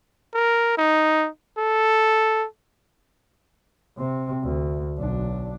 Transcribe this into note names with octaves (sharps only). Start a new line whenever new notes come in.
A#4
D#4
A4
C3 C4
D2
B1 D4